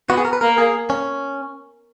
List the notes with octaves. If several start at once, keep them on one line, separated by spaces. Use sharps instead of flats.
B3 F#4
G#4
A#4
B4
A#3 A#4
G#4
C#4